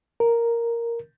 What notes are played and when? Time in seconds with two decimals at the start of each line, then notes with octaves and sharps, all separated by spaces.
0.20 A#4